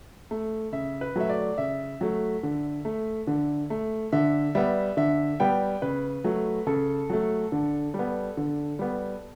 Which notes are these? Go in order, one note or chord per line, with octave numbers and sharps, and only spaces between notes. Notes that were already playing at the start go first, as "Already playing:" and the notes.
A3
C#3 E5
B4
F#3 A3 E5
D5
C#3 E5
F#3 A3
D3
A3
D3
A3
D3 E5
G3 B3 E5
D3 E5
G3 B3 G5
C#3 B4
F#3 A3
C#3 A4
F#3 A3
D3
G3
B3
D3
G3 B3